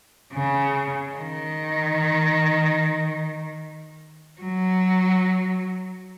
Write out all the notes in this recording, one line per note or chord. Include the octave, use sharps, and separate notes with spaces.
C#3
D#3
F#3